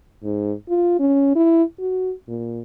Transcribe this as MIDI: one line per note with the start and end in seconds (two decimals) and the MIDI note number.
0.24 0.53 44
0.69 0.98 65
0.99 1.32 61
1.35 1.63 64
1.79 2.12 66
2.28 2.62 46